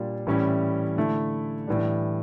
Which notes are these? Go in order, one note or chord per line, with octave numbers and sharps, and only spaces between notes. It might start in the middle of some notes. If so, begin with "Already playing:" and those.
Already playing: A#2 G3 D4
A2 E3 G3 C#4 E4
D3 A3 E4
A2 E3 G3 D4